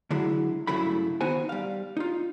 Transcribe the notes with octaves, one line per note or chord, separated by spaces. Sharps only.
D3 F#3 G#3 E4
G2 C#3 F#3 A3 E4 B5
D#3 B3 D#4 F#4 C5 G#5
G3 F5
D#4 F4